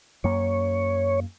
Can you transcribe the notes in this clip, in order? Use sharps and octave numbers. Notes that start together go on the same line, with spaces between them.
F#2 A#3 C#5